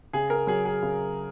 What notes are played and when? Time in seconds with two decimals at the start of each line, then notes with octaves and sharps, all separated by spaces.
0.13 C#3 G#4
0.30 A#4
0.47 F#3 G#4
0.65 G#4
0.83 C#3